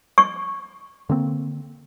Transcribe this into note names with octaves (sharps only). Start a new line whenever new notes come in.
C#6
D3 A#3 C4